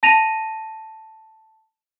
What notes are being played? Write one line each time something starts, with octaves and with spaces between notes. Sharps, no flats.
A5 A#6 D#7 F7